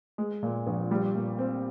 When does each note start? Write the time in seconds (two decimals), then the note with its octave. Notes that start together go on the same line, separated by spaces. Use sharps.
0.18 G#3
0.43 A#2
0.66 A#1
0.91 G3
1.15 A#2
1.39 C4